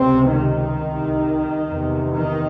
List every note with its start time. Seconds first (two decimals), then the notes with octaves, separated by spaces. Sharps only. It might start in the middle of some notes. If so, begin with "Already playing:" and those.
Already playing: C#2 C3 C4
0.33 D#3
0.78 C2 C3
1.68 E2 C3
2.12 D#3